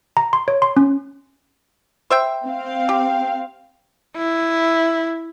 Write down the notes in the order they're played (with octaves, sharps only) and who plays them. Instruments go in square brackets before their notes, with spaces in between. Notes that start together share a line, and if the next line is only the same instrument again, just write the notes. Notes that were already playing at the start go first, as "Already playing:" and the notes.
[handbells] A#5
C6
C#5
C6
C#4
[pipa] C5 E5 G5
[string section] C4 F5
[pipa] G4 [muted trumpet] G5
[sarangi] E4